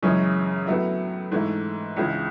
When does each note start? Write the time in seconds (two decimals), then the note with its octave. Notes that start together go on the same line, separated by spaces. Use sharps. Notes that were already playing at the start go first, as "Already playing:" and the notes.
0.03 F#2 C#3 E3 G#3 C#4
0.67 A2 F#3 B3 E4
1.32 G#2 E3 A3
1.97 C#2 C#3 E3